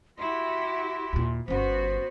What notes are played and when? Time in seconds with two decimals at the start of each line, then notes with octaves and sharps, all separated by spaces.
0.19 E4 F#4 G4 C6
1.13 D#2 A#2
1.48 G1 B3 C#4 F#4 C5